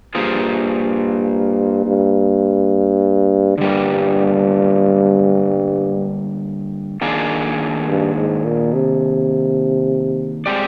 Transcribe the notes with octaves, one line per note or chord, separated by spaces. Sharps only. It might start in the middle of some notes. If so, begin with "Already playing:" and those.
G2 A#3 F4 G#4 C5
G2
G2 D3 G3 A#3
D#3 A#3 D4 F4 G#4
G2
G#2
A#2
C3
G#3 C4 G4 D5